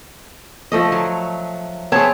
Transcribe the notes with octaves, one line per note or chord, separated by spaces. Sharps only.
F3 A3 D#5
F#3
B3 C4 G#4 C#5 A5